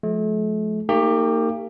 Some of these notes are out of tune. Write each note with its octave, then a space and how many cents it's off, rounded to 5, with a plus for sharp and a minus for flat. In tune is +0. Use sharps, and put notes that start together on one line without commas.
F3 +20 A3 -40
A#3 -35 D#4 +0 G4 +20